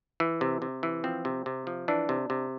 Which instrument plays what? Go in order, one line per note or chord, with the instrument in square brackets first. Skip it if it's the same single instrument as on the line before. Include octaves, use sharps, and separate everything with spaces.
[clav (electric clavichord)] E3
C3
C3
E3
F3 C4
C3
C3
F3
E3 D4
C3
C3